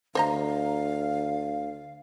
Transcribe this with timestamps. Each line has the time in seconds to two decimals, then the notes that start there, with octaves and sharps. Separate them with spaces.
0.15 D2 C5 D#5 F5 A#5